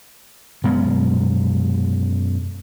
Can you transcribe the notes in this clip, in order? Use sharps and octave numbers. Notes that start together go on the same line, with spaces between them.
F#2 B2 G#3 B3